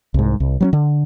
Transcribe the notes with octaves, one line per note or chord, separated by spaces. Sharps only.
C2 G#2
C2
F#3 B3 C#4
D3